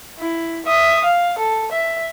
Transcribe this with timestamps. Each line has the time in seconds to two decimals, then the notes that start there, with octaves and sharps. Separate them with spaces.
0.19 E4
0.65 E5 D#6
1.04 F5
1.38 A4
1.71 E5